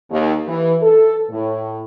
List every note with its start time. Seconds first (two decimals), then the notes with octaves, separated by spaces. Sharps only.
0.11 D#2
0.48 E3
0.82 A4
1.30 A2